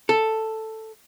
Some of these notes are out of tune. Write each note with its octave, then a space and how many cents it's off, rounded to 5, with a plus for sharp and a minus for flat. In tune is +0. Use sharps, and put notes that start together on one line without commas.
A4 +5